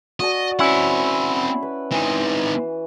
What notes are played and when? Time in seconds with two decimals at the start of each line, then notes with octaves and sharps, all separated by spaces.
0.20 F#4 D5 D#5 A5
0.59 C4 C#4 E4 F#5
1.63 B4
1.91 E3 C4 D#4